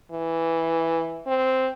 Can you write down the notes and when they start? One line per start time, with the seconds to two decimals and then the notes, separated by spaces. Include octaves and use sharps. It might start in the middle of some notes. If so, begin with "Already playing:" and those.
0.12 E3
1.27 C4